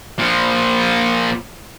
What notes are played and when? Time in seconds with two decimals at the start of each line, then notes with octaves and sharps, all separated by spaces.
0.19 A#2 F3